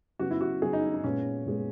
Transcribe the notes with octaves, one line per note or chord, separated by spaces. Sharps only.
C#3 F#3 B3 F#4
E4
F#4
C#3 F#3 B3 G#4
D#4
D#4
A#2 G#3 B3 C#4
A#2 G#3 B3